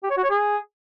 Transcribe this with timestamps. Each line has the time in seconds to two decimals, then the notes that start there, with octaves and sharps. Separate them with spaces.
0.03 G4
0.10 C#5
0.17 F#4
0.24 C#5
0.30 G#4